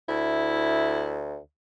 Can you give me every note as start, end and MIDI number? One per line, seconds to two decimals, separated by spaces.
0.09 1.38 38
0.09 1.19 64